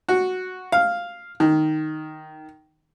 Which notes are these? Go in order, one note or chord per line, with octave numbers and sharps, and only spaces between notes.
F#4
F5
D#3